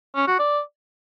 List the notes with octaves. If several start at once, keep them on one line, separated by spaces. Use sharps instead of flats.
C#4
F#4
D5